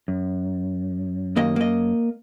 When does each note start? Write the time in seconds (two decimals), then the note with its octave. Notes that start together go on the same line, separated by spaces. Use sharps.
0.08 F#2
1.36 D#2 A#3 D#5
1.56 A#3 D#5